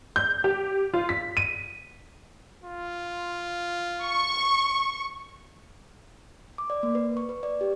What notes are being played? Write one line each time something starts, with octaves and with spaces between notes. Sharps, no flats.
G6
G4
F4
B6
D#7
F4
C#6
D6
D5
A#3
B4
C#6
B4
D5
G4